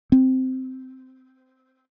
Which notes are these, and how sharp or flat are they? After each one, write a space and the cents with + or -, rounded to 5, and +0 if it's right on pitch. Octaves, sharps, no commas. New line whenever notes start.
C4 -10